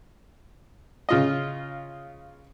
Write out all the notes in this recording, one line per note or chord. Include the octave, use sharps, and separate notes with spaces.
C#3 F4 D#5